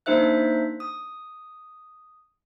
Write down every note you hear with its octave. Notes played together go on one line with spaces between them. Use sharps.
A#3 D4 D#4 C5 E5 F#6
D#6